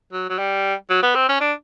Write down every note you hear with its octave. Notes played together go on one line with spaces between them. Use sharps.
F#3
F#3
G3
F#3
B3
C4
C#4
D4